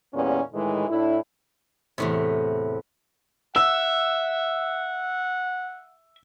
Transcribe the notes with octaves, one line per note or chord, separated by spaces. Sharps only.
E2 A#2 G3 B3 C#4
A2 D#3 E3 G#3
A2 D4 E4
E2 A2 C3
E5 F#5 E6